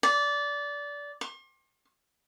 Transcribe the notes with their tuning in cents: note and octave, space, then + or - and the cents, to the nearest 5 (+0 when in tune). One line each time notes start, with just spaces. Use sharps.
D5 -20
C6 +45